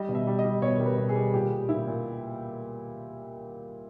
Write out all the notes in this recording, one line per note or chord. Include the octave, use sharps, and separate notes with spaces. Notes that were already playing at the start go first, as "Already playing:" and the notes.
Already playing: G3 D#5
B2
E5
G3
D#5
G3
B2 C#5
G3 A#4
B4
B2
G#4
G3
A#2 G4
G3
A#2 E4
A#2